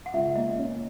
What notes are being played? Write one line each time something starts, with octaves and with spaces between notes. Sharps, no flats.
F#5
C#2 E5
A#3 D#5
C#4